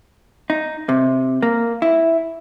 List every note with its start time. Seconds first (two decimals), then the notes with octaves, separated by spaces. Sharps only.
0.50 D#4
0.89 C3
1.42 A#3
1.82 E4